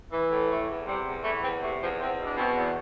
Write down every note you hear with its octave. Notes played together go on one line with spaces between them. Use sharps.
E3
A2
E3 A3
E2
C3 G3
E2
E3 A3
E2 C4
C3 A3
E2 F3
E2 C4
B2
D4
B2 C4
E2